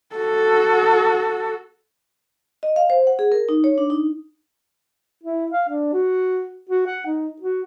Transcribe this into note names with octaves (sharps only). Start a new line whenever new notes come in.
F#4 A4
D#5
F5
C5
F#5
G#4
A#4
D#4
C#5
D4
D#4
E4
F5
D4
F#4
F#4
F#5
D#4
F#4